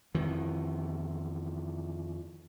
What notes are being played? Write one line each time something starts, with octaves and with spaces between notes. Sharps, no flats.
F2 D#3 E3